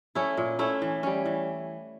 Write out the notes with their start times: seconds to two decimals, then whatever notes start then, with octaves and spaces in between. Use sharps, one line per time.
0.15 A3 C#4 E4
0.37 A#2
0.59 A3 C#4 E4
0.82 E3
1.03 G3 C#4
1.26 E3